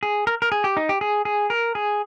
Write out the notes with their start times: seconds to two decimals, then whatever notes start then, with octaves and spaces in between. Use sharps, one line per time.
0.03 G#4
0.27 A#4
0.42 A#4
0.52 G#4
0.64 G4
0.77 D#4
0.89 G4
1.01 G#4
1.25 G#4
1.50 A#4
1.75 G#4